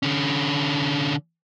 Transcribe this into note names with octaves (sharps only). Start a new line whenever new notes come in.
D3 C#4